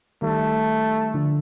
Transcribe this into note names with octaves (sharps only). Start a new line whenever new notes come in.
D#3 G3 A3
D3 F3